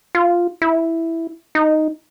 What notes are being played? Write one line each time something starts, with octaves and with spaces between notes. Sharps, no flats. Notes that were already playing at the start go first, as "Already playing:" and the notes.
F4
E4
D#4